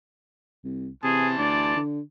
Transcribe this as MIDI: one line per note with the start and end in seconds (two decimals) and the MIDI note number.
0.64 0.89 36
1.04 1.35 48
1.04 1.78 52
1.04 1.29 68
1.04 1.78 81
1.04 1.78 84
1.38 1.75 38
1.38 1.82 74
1.76 2.00 50